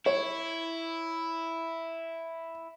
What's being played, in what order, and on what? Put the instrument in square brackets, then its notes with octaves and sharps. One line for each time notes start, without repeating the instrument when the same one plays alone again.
[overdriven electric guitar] E4 [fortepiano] C#5